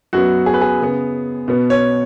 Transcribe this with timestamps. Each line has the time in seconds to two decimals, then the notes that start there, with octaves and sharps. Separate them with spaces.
0.13 F#2 F#3 B3 F#4
0.46 G#4
0.54 B4
0.61 G#4
0.81 C#3 B3
1.48 B2 B3
1.70 C#5